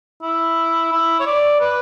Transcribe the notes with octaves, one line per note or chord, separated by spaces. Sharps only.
E4
E4
C#5
D5
B4